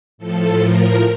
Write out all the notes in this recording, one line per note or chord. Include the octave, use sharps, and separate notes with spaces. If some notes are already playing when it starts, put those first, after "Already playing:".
A2 F3 A4
A#4